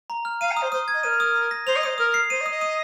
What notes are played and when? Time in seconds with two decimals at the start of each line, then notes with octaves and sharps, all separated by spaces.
0.10 A#5
0.25 F6
0.41 F5 D#7
0.51 A#5
0.57 D#6
0.62 C5
0.72 C5 D#6
0.88 G#6
0.94 D#5
1.03 A#4 D#7
1.20 D#6
1.36 D#6
1.51 A#6
1.67 C5 F7
1.76 D#5
1.83 C5 D#6
1.98 A#4 D#6
2.14 C7
2.30 C5 D#7
2.41 D#5
2.46 D#6
2.51 D#5
2.61 D#6